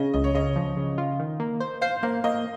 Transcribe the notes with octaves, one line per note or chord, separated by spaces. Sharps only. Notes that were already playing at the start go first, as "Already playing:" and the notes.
Already playing: C#3 D#5
C#2 D#5
C#5
C#3 D#5
F3
C#3
F4
D#3
A#3
C5
C5 F5
A#3 F5
A#3 D#5